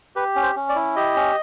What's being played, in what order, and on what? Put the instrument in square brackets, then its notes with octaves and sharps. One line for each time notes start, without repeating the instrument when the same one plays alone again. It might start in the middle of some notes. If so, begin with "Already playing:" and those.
[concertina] G4 B4
C#4
C5
C#4
D5
E4
G4 D#5
C#4